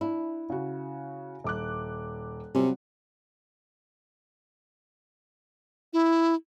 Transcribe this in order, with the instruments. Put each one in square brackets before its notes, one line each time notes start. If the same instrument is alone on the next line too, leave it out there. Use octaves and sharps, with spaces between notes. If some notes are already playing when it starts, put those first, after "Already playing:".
[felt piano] D4 [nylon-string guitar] E4
[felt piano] C#3 F#4
D#1 D6 F#6
[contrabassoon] C3 [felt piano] F#3 G3 [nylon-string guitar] C#4
[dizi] E4